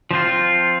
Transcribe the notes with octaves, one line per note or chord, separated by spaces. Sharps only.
F3 C4 F4